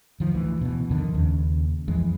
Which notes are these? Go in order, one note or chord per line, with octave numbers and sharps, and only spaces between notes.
D#3 F3
D2 E3
B2 E3
F2 D3 D#3
D#2 C#3
F2 E3 G#3